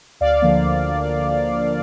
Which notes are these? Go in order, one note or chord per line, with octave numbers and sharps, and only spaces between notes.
D2 D5 F5
D3 F3 A#3
D2